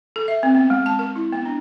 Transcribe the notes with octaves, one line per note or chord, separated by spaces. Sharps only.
A4
E5
C4
B3
G#3
A5
A#4
E4
B3
D4